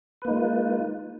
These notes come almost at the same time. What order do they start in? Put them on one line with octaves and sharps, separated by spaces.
B4 A#3 D#4 G#3 F4